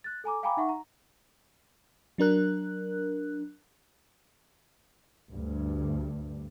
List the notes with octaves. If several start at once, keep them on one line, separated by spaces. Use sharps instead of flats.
F#6 A6
A4 G#5 A#5 D6
F5 G5 G#5 A#5 B5 D6
D#4 E5 F#5 C#6
A#5
F#3 D4 A#4 F#6
D2 G2